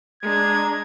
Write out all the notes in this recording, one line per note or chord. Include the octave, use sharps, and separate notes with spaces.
G#3 D4 A#5 G#6